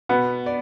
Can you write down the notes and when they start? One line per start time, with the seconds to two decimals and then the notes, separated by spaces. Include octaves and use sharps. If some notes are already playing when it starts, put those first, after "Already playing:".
0.09 B2 B3
0.46 D5